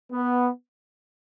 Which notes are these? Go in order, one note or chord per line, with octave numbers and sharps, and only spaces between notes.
B3